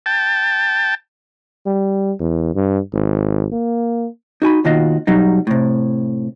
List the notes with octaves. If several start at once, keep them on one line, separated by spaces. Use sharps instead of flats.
G5 A5
G3
E2
G2
G#1
A#3
D#4 F#4 G#5 B5
D#2 B2 D#3 F4 F#4 D#5
B2 F#3 G3 D#4
A2 C3